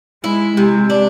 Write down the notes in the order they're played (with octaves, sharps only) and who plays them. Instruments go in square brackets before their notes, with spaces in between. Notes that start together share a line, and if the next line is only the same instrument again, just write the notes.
[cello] G#3 [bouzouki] E4
[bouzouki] C3 [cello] G#3
[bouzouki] D4